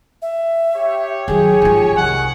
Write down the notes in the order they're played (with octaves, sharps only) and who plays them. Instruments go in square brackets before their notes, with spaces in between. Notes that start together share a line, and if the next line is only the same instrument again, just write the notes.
[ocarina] E5
[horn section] G4 C#5
[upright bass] D#3 F#3 [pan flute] G#4 [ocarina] G#5
[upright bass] G#2 F3
[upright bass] C2 [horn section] D#3 F#5